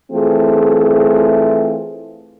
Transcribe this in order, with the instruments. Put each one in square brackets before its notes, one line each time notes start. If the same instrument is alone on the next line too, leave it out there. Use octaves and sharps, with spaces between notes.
[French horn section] E3 A3 C4 F4 G#4